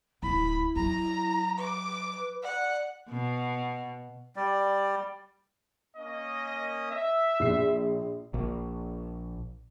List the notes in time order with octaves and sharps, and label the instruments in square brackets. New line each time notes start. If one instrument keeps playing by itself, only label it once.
[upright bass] D1 [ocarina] E4 [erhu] B5
[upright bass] F#3 [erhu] A#5
[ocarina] B4 [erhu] D6
[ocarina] D5 [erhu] F#5
[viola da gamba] B2
[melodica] G3 D5
[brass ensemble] A#3 C#4 D#5
E5
[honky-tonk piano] A#1 C7
[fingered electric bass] A#1